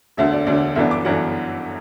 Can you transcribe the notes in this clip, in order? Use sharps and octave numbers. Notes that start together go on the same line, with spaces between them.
E1 D2 D3 E5
D5
E1 D2 D3 D5
G1 F#2 E3 B3 D4 E5
D6
G1 F#2 E3 B3 D4 F#5